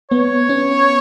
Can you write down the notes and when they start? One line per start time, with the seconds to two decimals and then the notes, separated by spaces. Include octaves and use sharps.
0.11 B3 C#5
0.49 C#4